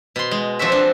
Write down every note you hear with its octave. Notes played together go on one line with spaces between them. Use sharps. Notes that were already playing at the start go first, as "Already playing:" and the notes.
B2 C6
G#3
F3 C4 F#4 E5
D4